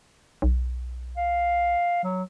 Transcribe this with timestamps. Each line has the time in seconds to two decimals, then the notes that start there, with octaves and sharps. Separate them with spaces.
0.42 B1
1.17 F5
2.04 F#3